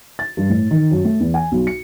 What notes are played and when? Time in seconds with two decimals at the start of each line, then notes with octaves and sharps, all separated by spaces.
0.19 A6
0.37 G2
0.50 A2
0.71 D#3
0.91 F#2
1.05 A3
1.20 E2
1.34 G#5
1.52 B1
1.67 C#7